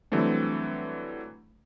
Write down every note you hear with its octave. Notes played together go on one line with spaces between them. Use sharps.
D3 E3 F#3 G3 A3 C4